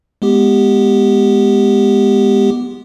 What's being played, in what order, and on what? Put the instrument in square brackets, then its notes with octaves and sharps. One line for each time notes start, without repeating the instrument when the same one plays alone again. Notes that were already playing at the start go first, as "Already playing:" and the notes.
[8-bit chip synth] G#3 B3 G4